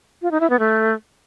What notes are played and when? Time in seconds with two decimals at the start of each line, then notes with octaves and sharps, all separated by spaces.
0.22 F4
0.31 D#4
0.41 E4
0.50 B3
0.59 A3